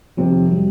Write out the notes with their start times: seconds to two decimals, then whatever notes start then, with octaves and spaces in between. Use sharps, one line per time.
0.17 F2 C3 D#3 F3
0.51 F#3
0.56 G3